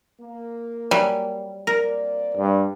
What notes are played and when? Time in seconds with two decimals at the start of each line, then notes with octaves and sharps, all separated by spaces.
0.20 A#3
0.91 F#3 G3 G#5
1.67 A#3 C4 A#4 D5
2.37 G2